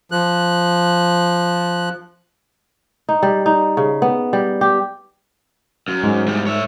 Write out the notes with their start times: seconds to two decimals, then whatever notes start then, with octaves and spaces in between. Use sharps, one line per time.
0.11 F3 F#6
3.09 D#4
3.23 G3
3.46 D#4
3.77 C#3
4.02 B3
4.33 G3
4.61 G4
5.88 F#2
6.04 G#2
6.27 E2 G3
6.47 C#5 E5